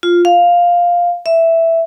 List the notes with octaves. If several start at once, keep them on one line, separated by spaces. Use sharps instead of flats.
F4
F5
E5